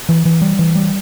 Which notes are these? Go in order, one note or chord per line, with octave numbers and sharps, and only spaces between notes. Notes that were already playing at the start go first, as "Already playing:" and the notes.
E3
E3
G3
E3
G3